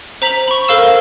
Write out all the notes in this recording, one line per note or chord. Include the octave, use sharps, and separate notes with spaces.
C5 A#5 B6 F7 F#7
B5 C#6
A4 A#4 C5 F5 E6 E7